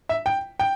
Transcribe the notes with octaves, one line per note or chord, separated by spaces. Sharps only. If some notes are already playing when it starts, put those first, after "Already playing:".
E5
G5
G5